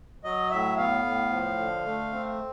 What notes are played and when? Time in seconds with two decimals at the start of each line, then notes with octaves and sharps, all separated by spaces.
0.24 F#3 D#5
0.51 A2 E5
0.77 B3 F5
1.05 A2
1.31 F3
1.58 D3
1.85 A3
2.12 C4